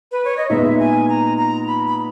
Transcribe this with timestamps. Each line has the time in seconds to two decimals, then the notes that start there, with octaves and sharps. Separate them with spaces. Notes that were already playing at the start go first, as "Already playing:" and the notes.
0.12 B4
0.25 C#5
0.37 D#5
0.49 A#2 G#3 B3 D#4 E5
0.79 G#5
1.09 A#5
1.38 A#5
1.67 B5
1.87 B5